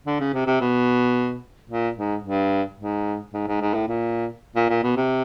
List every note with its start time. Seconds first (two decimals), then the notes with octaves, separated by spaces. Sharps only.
0.07 D3
0.20 C#3
0.34 C3
0.47 C3
0.61 B2
1.70 A#2
1.97 G#2
2.24 G2
2.79 G#2
3.33 G#2
3.47 G#2
3.61 G#2
3.74 A2
3.88 A#2
4.56 A#2
4.70 A#2
4.83 B2
4.96 C3